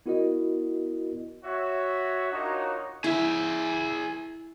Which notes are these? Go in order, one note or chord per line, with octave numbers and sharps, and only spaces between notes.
B3 E4 F#4 A#4 D5 D#5
F#4 C#5 E5
D4 D#4 F4 F#4 A#4 C#5
E4 G#4 E5